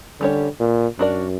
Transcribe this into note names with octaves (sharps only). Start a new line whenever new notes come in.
D3 G3 C#4 G4 C#5
A#2
F#2 D4 F#4 A#4 D5